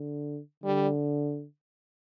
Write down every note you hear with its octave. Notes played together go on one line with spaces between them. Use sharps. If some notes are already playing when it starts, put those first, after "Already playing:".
Already playing: D3
D3 G3